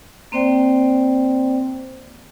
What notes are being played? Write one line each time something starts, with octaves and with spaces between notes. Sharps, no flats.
A#3 C4 C5 D5 G5